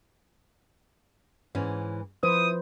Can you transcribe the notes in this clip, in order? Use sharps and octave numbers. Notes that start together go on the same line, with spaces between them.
G#2 E3 C#4
F3 E4 B4 C5 D#6